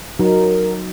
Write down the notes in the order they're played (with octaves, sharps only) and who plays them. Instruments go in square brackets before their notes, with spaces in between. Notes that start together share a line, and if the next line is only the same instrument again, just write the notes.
[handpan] F#3 D#4 [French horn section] A#4